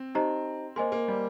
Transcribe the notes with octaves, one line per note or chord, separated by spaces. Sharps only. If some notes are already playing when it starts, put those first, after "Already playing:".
Already playing: C4
D#4 G4 C5 D#5 A#5
A#3 C5 D#5 G#5 C6
A#3
G3